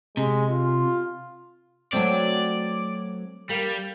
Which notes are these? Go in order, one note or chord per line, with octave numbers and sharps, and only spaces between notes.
C3 G#3
F4
F#3 A3 C4 D5
G3 A#3